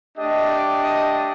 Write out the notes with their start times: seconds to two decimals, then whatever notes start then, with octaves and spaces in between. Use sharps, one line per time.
0.16 A3 D4 G4 D#5
0.49 D5
0.81 D#5